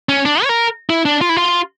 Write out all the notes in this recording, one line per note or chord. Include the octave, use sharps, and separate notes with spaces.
C#4
D4
C#5
A#4
E4
D4
F4
E4
F4